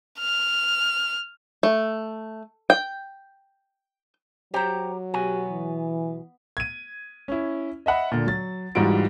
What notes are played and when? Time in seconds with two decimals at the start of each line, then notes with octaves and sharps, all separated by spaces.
0.19 F6
1.63 A3
2.70 G5
4.54 F#3 G4 C5 C#5 G5 A#5
5.14 B1 B3 F#4 G4 G#5
5.49 E3
6.57 G#6 D#7
7.28 C#4 E4
7.86 D#5 E5 F#5 B5
8.12 A#2 D3
8.27 F#3 A6
8.75 G#2 E3 G3 F4 F#4 D7